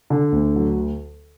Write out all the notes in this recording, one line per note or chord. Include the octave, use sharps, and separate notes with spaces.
D3
D2
F#3